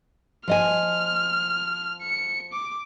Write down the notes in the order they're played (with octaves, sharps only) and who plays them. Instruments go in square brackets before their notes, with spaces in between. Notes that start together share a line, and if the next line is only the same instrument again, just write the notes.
[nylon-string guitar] F3 D#5 G#5 [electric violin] F6
[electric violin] C#7
D6